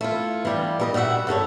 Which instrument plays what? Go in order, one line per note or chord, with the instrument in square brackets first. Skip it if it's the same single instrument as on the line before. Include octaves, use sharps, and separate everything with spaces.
[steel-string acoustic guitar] A3 E4 F4
E3 G3 F4
G3 A4 D#5
A#2 G3 F#4 E5 F#5
E2 G2 A4 C#5